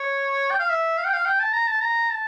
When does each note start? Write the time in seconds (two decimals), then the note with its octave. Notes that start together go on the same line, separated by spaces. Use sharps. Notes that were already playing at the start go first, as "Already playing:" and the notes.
Already playing: C#5
0.51 G5
0.59 F5
0.70 E5
0.98 F5
1.06 G5
1.13 F5
1.26 G5
1.40 A5
1.54 A#5
1.67 A5
1.82 A#5
2.10 A5